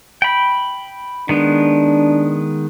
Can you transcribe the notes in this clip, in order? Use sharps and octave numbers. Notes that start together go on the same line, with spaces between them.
G5 B5
D#3 G#3 B3 D4